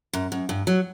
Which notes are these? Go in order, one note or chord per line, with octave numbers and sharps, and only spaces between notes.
F#2
F#2
G2
F#3